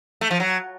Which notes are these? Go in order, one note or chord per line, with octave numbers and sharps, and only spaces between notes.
A3
F3
F#3